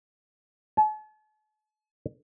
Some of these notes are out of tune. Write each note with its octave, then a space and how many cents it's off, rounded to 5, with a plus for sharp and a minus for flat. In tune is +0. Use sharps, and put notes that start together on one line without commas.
A5 -45